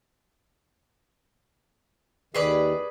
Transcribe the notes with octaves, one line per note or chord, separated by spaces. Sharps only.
D#2 D#3 G#4 B4 D5